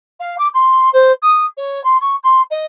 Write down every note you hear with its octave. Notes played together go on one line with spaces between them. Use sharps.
F5
D6
C6
C5
D#6
C#5
C6
C#6
C6
D#5